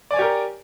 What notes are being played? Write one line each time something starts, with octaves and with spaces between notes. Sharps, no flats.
G4 A#4 C#5 D5 G#5